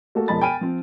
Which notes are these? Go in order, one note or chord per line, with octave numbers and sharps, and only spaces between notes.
A3 A#3 F#4 A4
E1 F3 G#3 A5 B5 A6
G5 G#5 B5 F6 D7 D#7
F3 C4